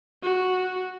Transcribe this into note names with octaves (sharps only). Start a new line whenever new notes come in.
F#4